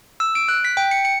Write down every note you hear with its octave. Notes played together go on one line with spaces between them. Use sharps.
E6
D7
F#6
B6
G5
C#7
C#7